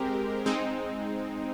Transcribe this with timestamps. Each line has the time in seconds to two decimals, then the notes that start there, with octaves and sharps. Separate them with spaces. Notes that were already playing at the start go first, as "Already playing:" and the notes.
Already playing: G#3 C4 G4 A#4
0.46 G#3 C4 D#4